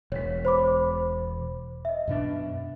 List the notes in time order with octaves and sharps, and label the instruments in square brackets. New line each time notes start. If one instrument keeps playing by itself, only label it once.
[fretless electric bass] E1 [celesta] C#5 B6
[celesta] C5 B5 D6
D#5 E5
[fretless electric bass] F#2 B2 D4